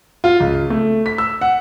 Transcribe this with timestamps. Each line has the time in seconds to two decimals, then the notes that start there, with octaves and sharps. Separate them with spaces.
0.24 F4
0.40 C#2
0.70 A3
1.06 B6
1.18 E6
1.41 F#5